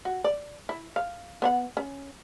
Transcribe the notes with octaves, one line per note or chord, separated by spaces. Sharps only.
F#4
D5
E4
F5
B3 C#5 F#5
C#4